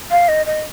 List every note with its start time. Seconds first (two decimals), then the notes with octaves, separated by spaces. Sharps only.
0.11 F5
0.28 D#5
0.46 D#5